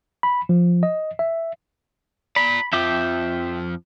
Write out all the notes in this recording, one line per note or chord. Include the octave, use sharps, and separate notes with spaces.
B5
F3
D#5
E5
D5 A#5 B5
F2 F3 E5 G5 D6